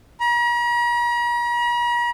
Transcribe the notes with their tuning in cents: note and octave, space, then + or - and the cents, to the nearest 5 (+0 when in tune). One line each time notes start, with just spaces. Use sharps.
A#5 +45